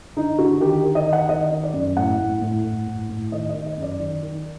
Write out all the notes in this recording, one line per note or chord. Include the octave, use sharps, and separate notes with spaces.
D3 D#4
D3 F#4
D#3 G4
D#3
D#5
D#3
F#5
D#3 D#5
D#3
D5
F#2
A2 F#5
A2
A2
A2
A2
A2
D#3 D#5
D#5
D#3
D#5
F#2 D5
D#3
D#3